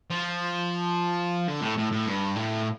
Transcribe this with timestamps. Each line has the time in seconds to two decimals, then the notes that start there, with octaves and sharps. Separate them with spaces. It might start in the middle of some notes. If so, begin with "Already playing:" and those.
0.10 F3
1.48 D3
1.62 A2
1.78 A2
1.92 A2
2.06 G2
2.36 A2